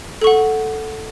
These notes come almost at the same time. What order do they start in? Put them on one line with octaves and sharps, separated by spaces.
A4 C#6 F#5